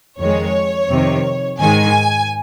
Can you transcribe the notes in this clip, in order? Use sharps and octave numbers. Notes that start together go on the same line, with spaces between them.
F2 D#3 G#3 C#5
F2 C3 D#3
G#2 D#3 G#3 G#5